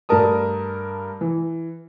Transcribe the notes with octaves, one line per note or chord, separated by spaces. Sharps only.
G2 A3 D4 A#4 A5 D#6
E3